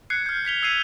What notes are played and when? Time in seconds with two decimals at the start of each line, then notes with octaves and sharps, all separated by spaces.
0.10 F#6 G#6 C7 C#7
0.26 F6 G6
0.45 G#6 B6 F7 G7
0.63 E6 G#6 C7 D#7 F7